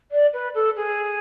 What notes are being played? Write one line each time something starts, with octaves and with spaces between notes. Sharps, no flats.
D5
B4
A4
G#4